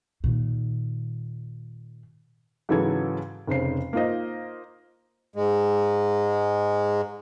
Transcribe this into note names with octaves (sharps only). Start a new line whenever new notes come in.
A#2 D#3
G#2 C#3 E3 F#3 A4 G#6
F1 C#3 C5 C7
A#3 D#4 F4 C5 D#5
G#2 G#3